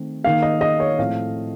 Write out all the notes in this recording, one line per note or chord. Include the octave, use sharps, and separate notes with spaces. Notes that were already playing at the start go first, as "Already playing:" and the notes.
Already playing: D#3 A3 C4
D#3 A#3 F5
D#5
D#5
C#5
A2 F3 A3 C4 F5